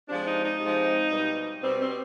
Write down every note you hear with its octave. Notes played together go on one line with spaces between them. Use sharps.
C3 F3 G#3 D4
D#4
D#4
C3 F3 G#3
B2 G3
B2 G3 C4
C4